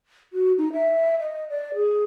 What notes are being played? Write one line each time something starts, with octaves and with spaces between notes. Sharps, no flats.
F#4
D#4
E5
D#5
D5
G#4